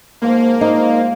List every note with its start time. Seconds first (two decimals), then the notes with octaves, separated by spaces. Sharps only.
0.22 G#2 F3 A#3
0.61 D#4 F4 D5